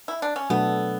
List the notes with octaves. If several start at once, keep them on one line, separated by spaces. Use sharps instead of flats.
E4
D4
C#4
B2 F#3 A3 B3 D4 A4